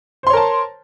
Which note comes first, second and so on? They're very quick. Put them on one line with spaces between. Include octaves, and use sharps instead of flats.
C5 C6 C#5 A#4 A5